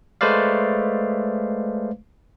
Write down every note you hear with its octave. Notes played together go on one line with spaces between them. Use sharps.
G#3 A3 B4 C5 D5 F5